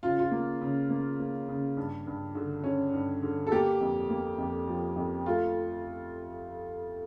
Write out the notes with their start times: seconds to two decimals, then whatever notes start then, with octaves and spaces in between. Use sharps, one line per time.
0.03 C#3 F4
0.19 F4
0.31 A#3
0.61 C#3
0.90 A#3
1.19 A#3
1.49 C#3
1.77 G2
2.07 G2
2.35 D3
2.64 C#4
2.93 G2
3.22 D3
3.47 A4
3.52 A#3 G4
3.81 F2
4.10 A#3
4.38 F2
4.67 F3
4.96 F2
5.26 A3 F4